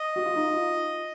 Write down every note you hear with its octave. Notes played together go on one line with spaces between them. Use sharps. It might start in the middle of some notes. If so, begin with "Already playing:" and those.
Already playing: D#5
F#4
F4
D#4
F4